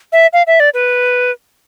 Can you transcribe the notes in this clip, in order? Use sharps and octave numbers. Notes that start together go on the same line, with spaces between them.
E5
F5
E5
D5
B4